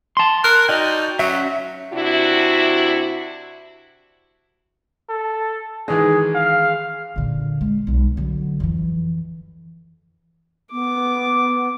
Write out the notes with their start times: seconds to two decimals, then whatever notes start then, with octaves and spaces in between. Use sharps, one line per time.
0.17 A5 C6
0.44 A#4 F#6
0.69 D#4 F#4 D5 G5
1.19 F#3 C#4 F#4 E5
1.93 C3 D4 E4 F#4
5.09 A4
5.88 D#3 E3 G#3 G#4
6.35 F5
7.16 A#2 D3
7.61 G#3
7.87 B1 G#3
8.17 D3 F#3
8.60 F2 E3
10.72 B3 D6